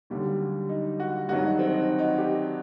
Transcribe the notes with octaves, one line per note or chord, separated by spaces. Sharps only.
D#2 D3 F#3 G3
D#4
F#4
G2 D#3 F#3 F#4
D#4
C4
D#4
D#4
D#4
F#4
G4